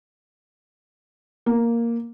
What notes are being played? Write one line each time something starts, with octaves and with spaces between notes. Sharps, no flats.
A#3